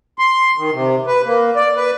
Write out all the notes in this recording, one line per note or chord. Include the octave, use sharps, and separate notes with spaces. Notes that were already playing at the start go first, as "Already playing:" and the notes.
C6
D#3
C3
B4
A#3
D5
B4